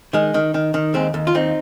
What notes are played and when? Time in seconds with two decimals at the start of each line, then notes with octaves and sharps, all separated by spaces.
0.13 D#3 G#3
0.34 D#3
0.54 D#3
0.74 D#3
0.94 D#2 G#3 C4
1.14 D#2
1.27 F4
1.35 D#2 C4 D#4